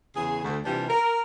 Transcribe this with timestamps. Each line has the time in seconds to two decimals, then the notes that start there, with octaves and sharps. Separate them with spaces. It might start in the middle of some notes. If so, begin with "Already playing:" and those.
0.15 E2 C#3 G#4
0.44 D2
0.65 C3 E3 G3 D4 F4
0.89 A#4